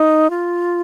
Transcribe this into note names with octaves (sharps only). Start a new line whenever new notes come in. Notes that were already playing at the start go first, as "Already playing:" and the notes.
Already playing: D#4
F4